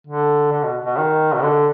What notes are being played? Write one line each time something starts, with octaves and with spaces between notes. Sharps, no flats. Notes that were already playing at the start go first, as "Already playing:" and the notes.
D3
D3
B2
B2
D#3
B2
D3